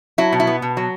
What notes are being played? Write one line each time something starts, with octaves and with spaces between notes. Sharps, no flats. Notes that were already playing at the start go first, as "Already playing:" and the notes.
F#3 E4
B2
E4
B3
B2
F#3